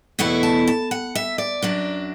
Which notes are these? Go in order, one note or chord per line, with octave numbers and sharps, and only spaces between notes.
E2 B2 A3 E4 F#5
A5
A5
F#5
E5
D5
F#2 F#3 D4